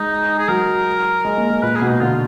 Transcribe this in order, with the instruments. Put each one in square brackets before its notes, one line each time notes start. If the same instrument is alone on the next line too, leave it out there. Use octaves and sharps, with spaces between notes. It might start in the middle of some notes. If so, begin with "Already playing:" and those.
Already playing: [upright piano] G#3 [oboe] D#4
[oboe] G#4
[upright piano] F#3 [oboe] A#4
[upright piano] G#3
A#3
G#3
[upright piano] A#2 [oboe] B4
[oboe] G#4
[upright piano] B2
[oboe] D#4
[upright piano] D3 [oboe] F4